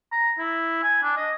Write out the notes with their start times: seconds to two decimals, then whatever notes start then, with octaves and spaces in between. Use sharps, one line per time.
0.12 A#5
0.39 E4
0.83 G#5
1.03 D4
1.17 D#5